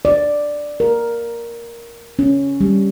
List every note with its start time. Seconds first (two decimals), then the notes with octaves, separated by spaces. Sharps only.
0.05 D5
0.80 A#4
2.19 C#4
2.61 G3